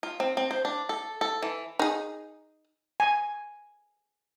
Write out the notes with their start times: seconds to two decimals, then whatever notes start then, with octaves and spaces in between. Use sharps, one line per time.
0.03 F4
0.20 C4
0.37 C4
0.51 C5
0.65 D4
0.89 A4
1.21 A4
1.42 E3
1.79 D#4 G#4
3.00 G#5